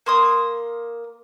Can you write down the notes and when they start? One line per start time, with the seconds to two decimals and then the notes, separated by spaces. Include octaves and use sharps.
0.06 A#3 C6 D#6